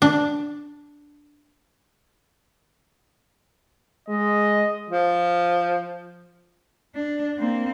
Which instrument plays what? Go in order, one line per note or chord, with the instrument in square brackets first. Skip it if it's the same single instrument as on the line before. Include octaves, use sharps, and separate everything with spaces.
[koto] D4
[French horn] G#3 [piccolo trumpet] D#5
[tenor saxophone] F3
[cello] D4
A#3 C4